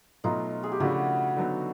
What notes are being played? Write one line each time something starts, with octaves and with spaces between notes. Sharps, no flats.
B2 F#3 A3 D#4 F4
G#4
G4
C#3 F3 A3 D4 E4 F#4
D3 F#3 B3 D#4